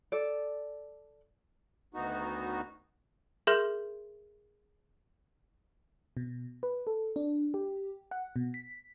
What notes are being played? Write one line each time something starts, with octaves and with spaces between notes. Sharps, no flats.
A4 D5
D2 D#3 B3 D#4 F#4
G#4 A#4 E5 C6 F6 G6
B2
B4
A4
D4
G4
F#5
B2
B6